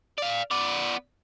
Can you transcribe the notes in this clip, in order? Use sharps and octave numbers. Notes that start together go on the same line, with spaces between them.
D5 F5
B3 D5